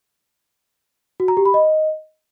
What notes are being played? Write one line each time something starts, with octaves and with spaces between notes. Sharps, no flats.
F#4
A#5
G4
B5
D#5